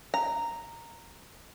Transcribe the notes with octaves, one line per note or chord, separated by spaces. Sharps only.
A#5